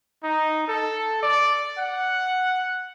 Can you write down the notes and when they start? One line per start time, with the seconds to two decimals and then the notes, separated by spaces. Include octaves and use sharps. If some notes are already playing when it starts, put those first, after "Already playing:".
0.24 D#4
0.68 A4
1.23 D5
1.78 F#5